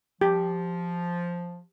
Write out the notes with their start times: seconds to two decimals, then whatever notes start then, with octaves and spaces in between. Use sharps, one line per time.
0.21 F3 G4